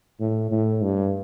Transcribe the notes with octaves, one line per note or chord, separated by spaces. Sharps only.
A2
A2
G2